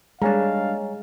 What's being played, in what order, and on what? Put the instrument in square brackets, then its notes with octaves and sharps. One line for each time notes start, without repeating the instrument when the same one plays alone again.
[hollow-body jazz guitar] G3 A#3 D4 [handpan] G#3 [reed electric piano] C#5 G#5 A#5 [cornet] F5